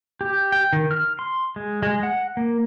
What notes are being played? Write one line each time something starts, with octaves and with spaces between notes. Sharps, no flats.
G4
G5
D#3
F6
C6
G#3
G#3
F#5
A#3